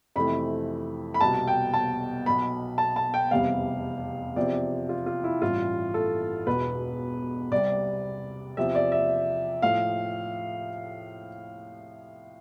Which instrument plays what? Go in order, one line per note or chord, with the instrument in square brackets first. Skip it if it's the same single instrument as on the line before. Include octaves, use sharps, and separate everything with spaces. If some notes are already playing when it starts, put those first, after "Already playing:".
[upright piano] F2 C3 E3 A3 B5
B5
C2 B2 B3 A5
G5
A5
B1 B2 B3 B5
A5
A5
G5
F1 E2 C3 G3 B3 F5
E2 C3 F3 D5
F4
F4
E4
A1 G2 E3 F4
A4
E1 E2 B2 B3 B4
C2 C3 G3 D5
E2 C3 F3 E5
D5
E5
A2 F3 F5